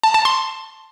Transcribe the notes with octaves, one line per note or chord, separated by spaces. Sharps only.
A5
A5
C6